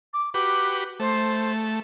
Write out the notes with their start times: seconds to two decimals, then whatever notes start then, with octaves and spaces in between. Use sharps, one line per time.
0.13 D6
0.34 F#4 G4 B4 D6
1.00 A3 C5